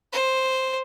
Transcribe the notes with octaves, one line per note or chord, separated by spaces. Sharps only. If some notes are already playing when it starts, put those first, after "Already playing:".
C5